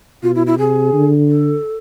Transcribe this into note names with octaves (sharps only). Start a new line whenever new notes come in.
B2 F4
E4
E4
C3 G#4
D3
A4